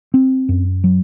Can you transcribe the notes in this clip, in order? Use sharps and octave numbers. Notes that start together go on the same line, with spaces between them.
C4
F#2
F#3